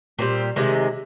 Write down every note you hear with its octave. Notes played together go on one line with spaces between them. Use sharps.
A#2 G3 C4
C3 D#3 G#3